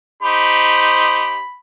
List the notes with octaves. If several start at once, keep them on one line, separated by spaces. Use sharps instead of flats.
D#4 G4 C5 B5